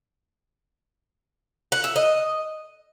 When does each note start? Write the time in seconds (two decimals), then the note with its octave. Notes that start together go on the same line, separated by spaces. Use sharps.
1.72 F#5
1.84 E5
1.96 D#5